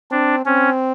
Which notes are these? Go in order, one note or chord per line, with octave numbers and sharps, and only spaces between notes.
C4 D4
C4 C#4